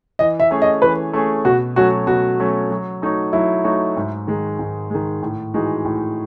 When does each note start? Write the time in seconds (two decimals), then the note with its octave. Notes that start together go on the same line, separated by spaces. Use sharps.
0.19 E3 D#5
0.40 E5
0.51 A3 C#4 G#4
0.62 D#5
0.82 E3 B4
1.13 A3 C#4 G#4
1.45 B2 F#4
1.76 F#3 A3 C#4 F#4
2.07 B2 F#4
2.39 F#3 A3 C#4
2.71 F#3
3.02 A3 D#4 F#4 C#5
3.33 F#3 E4
3.64 A3 D#4 F#4 C#5
3.96 G#2
4.27 D#3 G#3
4.59 G#2
4.90 D#3 G#3
5.22 A2
5.54 E3 G#3 D#4 F#4
5.85 A2